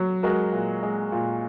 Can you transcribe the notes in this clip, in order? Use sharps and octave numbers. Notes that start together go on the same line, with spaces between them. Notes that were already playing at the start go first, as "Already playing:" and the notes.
Already playing: F#3
G#3 F#4 A#4
A#2
G#3
A#2